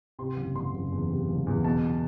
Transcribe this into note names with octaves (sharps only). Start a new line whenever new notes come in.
C3 C6
F#1
F#1 C6
F#1
E2
C3
F#1
E2
B2 A5